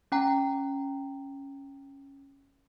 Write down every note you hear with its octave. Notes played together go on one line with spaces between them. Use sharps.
C#4 G5 A#5